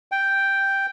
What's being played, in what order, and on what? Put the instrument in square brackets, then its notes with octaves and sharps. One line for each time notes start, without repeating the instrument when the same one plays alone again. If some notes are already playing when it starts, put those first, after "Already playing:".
[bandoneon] G5